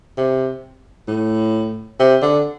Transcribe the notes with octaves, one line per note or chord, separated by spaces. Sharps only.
C3
A2
C3
D3